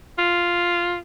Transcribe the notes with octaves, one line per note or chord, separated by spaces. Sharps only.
F4